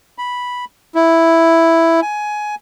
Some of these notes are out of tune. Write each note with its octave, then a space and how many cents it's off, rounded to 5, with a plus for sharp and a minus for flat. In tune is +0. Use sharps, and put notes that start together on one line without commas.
B5 -5
E4 +0
G#5 +15